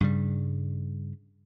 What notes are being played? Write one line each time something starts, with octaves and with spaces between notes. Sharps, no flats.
G2 C#3 G3